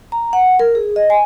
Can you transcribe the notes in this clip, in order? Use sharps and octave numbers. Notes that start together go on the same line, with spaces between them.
A#5
F#5
A#4
G#4
D#5
G#5